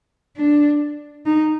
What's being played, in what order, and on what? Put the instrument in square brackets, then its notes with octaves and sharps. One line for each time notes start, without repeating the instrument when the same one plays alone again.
[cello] D4
D#4